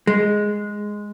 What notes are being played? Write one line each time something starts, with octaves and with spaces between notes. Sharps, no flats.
G#3